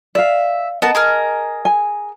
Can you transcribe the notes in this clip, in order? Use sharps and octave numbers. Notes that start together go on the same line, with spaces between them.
D5 E5 F5
B3 A#4 D#5 A5
G#4 A#4 F6
G#5